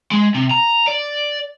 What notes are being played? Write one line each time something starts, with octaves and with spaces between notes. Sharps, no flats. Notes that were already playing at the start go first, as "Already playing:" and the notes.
G#3
C3
A#5
D5